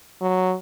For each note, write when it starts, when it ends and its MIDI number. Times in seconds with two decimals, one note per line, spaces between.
0.22 0.55 54